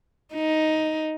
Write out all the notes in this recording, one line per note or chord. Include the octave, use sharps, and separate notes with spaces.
D#4